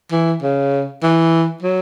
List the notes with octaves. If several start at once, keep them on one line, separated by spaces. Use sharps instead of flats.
E3
C#3
E3
F#3